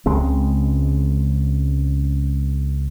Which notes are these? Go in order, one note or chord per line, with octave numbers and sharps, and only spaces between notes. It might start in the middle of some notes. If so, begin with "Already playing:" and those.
C#2 C#3 G#3 C4